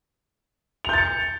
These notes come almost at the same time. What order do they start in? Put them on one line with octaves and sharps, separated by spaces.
F7 G6 A6 C#7